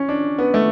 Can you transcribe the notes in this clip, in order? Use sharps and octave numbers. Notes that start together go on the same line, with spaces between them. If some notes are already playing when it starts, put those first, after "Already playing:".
Already playing: C#4
D4
B3
A3